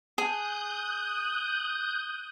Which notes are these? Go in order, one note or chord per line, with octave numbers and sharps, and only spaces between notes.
G#4 D#6 F#6 G6